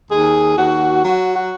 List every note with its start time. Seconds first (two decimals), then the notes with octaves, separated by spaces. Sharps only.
0.10 D#2 G#4
0.57 D#2 F#4
1.04 F#3 F#4
1.35 F#4